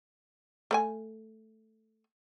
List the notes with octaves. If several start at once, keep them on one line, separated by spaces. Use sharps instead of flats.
A3 B4 G#5